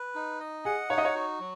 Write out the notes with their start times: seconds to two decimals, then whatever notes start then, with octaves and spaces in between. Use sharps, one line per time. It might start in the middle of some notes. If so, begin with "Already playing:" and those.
Already playing: B4
0.15 D#4
0.40 D#5
0.65 G#4 F#5
0.90 D#4 C#5
0.98 D#5
1.05 C#5
1.15 F#4
1.40 F#3